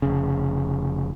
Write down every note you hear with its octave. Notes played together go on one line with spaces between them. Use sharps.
F1 C#3